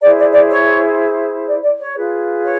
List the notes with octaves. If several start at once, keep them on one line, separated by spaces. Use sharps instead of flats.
E4 G#4 C5 D5
D5
D5
C#5
D5
D5
C#5
F4 G#4 B4
C#5